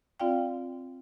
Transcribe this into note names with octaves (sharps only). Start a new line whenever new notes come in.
C4 F4 D5 F5 G5